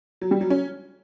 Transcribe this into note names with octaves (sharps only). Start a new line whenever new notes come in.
F#3
G3
F#3
C#4